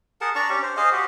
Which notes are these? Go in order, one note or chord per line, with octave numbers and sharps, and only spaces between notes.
G#4 A#4 F#5 A5
D4 D5 A#5 C#6
C#4 G4
C5
G#4 C5 D#5 F5
F#4 G4